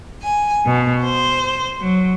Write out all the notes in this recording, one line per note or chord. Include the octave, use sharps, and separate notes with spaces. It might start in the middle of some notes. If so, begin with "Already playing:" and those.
G#5
B2
C5
F#3